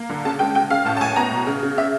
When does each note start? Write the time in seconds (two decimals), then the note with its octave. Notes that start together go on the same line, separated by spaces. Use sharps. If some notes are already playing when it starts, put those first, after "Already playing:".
Already playing: A#3
0.09 D3
0.25 C#3 A5
0.39 G#3 G5
0.55 C#3 G5
0.70 C#3 F5
0.85 A2 A5
0.97 A5
1.01 A2 G#5
1.16 B3 A#5
1.31 B2
1.47 C#3
1.63 C#3
1.78 E5